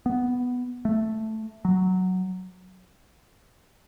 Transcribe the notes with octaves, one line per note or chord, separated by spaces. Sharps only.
B3
A3
F#3